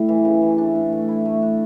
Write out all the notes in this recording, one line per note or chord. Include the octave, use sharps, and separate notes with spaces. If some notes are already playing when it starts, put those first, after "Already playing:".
Already playing: A2 G3 A3
E3
C#3
E3
D4
A2
A3
E4
A3
D4